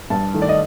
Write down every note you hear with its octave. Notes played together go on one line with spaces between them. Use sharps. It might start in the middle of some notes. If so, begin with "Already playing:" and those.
G2 A5
D#3 A3
D5
D#5